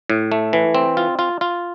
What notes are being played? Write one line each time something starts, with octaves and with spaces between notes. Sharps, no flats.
A2
A3
E3
C4
F4
F4
F4